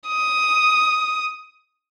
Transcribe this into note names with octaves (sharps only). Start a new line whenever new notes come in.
D#6